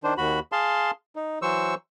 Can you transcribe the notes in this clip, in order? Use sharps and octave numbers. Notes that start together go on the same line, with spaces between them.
D#3 D4 C5
D#2 F#4 B5
G#4 F5 A5 C6
D#4
E3 F#3 C5 C#6 E6